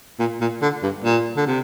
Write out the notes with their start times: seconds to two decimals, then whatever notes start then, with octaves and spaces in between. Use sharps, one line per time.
0.19 A#2
0.40 A#2
0.62 D3
0.82 G2
1.04 A#2
1.36 D3
1.46 C3